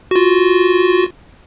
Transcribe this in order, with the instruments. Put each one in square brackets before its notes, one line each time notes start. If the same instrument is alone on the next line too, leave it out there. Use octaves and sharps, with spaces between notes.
[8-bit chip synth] F4 F#4